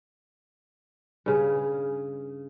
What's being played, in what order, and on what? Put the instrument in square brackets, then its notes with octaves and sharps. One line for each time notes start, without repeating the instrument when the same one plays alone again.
[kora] G2 C#3 G#4